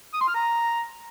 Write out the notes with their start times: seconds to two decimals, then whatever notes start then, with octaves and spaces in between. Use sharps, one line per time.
0.14 D#6
0.21 C6
0.28 F6
0.35 A#5